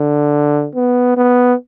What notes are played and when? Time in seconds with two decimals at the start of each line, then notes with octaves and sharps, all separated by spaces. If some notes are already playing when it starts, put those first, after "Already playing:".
Already playing: D3
0.75 B3
1.17 B3